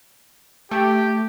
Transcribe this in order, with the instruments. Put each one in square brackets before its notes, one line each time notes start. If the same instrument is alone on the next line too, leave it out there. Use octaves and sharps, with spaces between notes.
[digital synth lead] A3 [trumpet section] G4